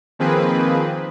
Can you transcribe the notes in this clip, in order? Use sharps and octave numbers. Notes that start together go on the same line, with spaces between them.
D#3 F3 A#3 C4 G#4 B4